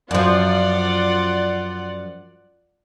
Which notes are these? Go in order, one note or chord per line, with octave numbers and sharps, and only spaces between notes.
F#2 F3 F4 D5 F#5